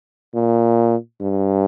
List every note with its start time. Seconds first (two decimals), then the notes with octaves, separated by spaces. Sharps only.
0.34 A#2
1.21 G2